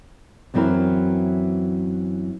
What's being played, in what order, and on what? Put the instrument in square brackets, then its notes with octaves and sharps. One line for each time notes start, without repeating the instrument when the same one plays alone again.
[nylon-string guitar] F#2 E3 F#3 C4 E4 A#4